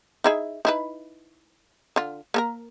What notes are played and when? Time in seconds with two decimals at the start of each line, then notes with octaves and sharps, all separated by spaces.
0.24 D#4 E4 G#4
0.65 D#4 E4 B4
1.96 D3 F4
2.34 A#3 A4 A#4